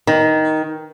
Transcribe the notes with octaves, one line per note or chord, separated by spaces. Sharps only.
D#3